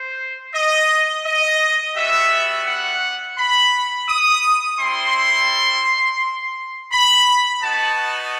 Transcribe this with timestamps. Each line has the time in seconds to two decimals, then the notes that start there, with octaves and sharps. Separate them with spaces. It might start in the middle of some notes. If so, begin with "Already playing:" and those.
Already playing: C5
0.54 D#5
1.25 D#5
1.96 G3 B3 F#4 E5
2.67 F#5
3.38 B5
4.08 D#6
4.79 G3 C4 E4 C6
6.92 B5
7.62 B3 D#4 F#4 A5